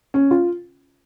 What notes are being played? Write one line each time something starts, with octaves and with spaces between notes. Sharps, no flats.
C#4
F4